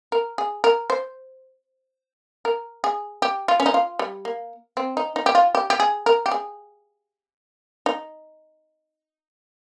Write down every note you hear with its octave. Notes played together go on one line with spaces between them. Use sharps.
A#4
G#4
A#4
C5
A#4
G#4
G4
F4
C#4
D#4
F4
G3
A#3
C4
D#4
D#4
G4
F4
G4
G4
G#4
A#4
G4
G#4
D#4